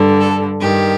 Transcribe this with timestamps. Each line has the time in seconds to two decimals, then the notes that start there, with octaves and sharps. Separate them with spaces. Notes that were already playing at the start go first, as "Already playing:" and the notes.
Already playing: G2 D3
0.21 A4
0.61 G2 D#3 G4